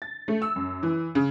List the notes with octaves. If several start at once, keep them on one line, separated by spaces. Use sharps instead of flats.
A6
A3
E6
F#2
E3
C#3